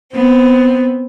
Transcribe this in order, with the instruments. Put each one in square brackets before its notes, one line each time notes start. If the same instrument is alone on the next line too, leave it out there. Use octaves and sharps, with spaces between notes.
[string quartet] B3 C4